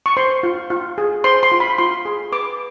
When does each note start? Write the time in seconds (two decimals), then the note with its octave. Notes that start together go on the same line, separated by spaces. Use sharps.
0.06 C#6
0.17 C5 C6
0.43 F4
0.70 F4
0.98 G#4
1.24 C5 C6
1.43 C6
1.52 F4
1.60 B5
1.78 F4 C6
2.05 G#4
2.32 B4 D6